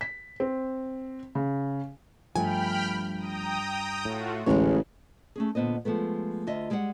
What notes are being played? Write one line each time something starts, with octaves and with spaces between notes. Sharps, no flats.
B6
C4
C#3
G2 F3 A3 G5 G#5 B5 F6
G5 A#5 D#6
A2 A3 F4 F#4
A1 D2 A2 C#3 G#3 C#5
A3 C#4 G#4
A#2 D3 B3 C5 D#5
F3 G#3 A3 B3
D2 F4 D#5 E5
G3 G#3 D5 D#5 F#5